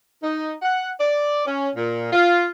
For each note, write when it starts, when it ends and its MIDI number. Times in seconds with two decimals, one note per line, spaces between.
0.21 0.53 63
0.62 0.89 78
0.99 1.45 74
1.46 1.68 61
1.76 2.11 46
2.12 2.46 65